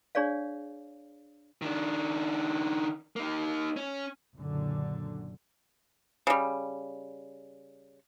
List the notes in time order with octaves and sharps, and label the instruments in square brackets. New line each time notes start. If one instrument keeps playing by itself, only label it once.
[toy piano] D4 G#4 C#5 D5 F5
[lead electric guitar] D#3 D4
A#3 D#4
C#4
[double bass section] F#1 A#2 D3
[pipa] C#3 G3